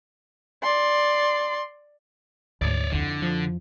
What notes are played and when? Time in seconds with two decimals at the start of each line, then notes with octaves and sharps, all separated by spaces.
0.63 D5 C6
2.62 D2 G#2 C#5 D5
2.92 F2 D3 E4
3.22 F3